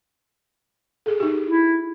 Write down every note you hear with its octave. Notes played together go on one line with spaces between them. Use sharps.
G#4 A4
D#4 G4
E4